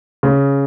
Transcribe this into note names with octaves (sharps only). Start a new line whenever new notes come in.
C#3